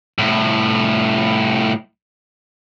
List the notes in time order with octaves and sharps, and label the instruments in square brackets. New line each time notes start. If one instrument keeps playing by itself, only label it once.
[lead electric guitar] C2 A2